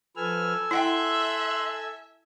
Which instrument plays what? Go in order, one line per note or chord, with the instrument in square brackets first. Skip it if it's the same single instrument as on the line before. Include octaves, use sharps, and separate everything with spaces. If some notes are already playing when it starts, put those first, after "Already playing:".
[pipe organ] F3 B4 F6 [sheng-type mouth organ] A4 G#5 E6
[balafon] E4 F#5 G5 [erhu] E5 [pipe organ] C6 F#6